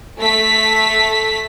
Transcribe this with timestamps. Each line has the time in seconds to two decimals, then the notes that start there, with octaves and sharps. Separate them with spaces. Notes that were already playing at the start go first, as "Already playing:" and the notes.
0.20 A3 B6